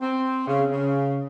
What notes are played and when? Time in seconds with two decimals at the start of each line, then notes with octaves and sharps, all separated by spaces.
0.02 C4
0.48 C#3
0.70 C#3